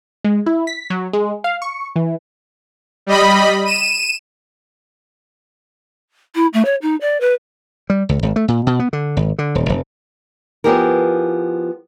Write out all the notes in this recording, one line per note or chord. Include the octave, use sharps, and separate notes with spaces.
G#3
E4
B6
F#3
G#3
F5
C#6
E3
G3 D#5 B5
D#7 E7
E4
A3
C#5
D#4
D5
B4
G3
C#2
G#1
A3
A#2
B2
B3
D3
G#1
D3
D#1
F1
F3 B3 E4 G4 G#4 A#4